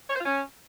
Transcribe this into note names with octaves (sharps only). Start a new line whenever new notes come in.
C#5
C5
F4
C#4